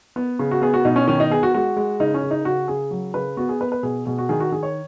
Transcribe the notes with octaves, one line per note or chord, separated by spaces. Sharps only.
B3
C#3
F#4
B3 G#4
F#4
B2 D#4
C#4
D#3 C#4
D#4
B3 G#4
F#4
G#3 F#4
G#3
C#3 D#4
C#4
C#3
D#4
C#3 F#4
C#3 G#4
F#3
C#3 B4
B3 F#4
G#4
B3 B4
B4
B2 G#4
B2 G#4
F#4
D#3 G#4
F#4
D#3 G#4
C#5